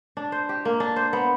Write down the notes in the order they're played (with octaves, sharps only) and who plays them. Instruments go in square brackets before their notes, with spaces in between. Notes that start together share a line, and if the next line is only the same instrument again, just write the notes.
[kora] D4
C5
G4
A#3
D4
C5
B3